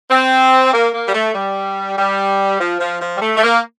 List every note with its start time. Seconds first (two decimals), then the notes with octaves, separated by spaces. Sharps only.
0.11 C4
0.73 A#3
0.94 A#3
1.08 G3
1.15 A3
1.35 G3
1.98 G3
2.60 F3
2.81 F3
3.01 F3
3.17 G3
3.22 A3
3.37 A3
3.43 A#3